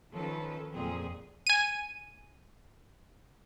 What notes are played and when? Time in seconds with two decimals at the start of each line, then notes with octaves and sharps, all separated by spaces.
0.13 D#3 F3 C#4 A4 B4
0.74 F2 A#2 C4 G#4
1.47 G#5 D#7